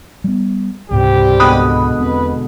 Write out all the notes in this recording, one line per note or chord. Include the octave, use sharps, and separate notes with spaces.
G3 B3
C#2 G#2 C3 G3 C4 G4
B2 D3 G#3 B5 D#6 F#6
E1 C4 B4